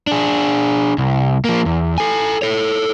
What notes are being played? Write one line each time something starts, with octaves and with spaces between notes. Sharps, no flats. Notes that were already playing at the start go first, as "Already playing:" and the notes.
D4 G#4
C2
F3 A#3
E2
A4 G#5
A4 C#5